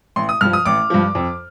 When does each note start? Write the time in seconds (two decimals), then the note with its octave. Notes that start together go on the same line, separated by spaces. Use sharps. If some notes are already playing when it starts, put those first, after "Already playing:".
0.16 A1 C6
0.29 D#6
0.41 G2 F3 F6
0.53 D#6
0.65 A1 D6
0.90 G2 F3
1.15 F2